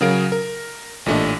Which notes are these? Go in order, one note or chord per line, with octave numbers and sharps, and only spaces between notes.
C#3 F#3 G#4 A#4 F5 D7
A#4
A1 A#2 A3 D4 D#5